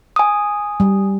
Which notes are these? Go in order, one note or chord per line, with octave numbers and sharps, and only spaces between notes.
G#5 D#6
G3